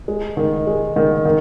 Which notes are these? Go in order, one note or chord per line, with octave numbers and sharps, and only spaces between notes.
G#3
D#3
G#3
D#3
D#3